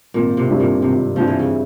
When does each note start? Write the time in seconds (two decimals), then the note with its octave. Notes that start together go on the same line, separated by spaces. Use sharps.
0.14 G#1 A#2
0.37 C3
0.48 G2 G3 C4 E4
0.60 A#2
0.81 G#1 C3
1.16 G2 F3 G3 C4 E4
1.27 E3
1.39 C#3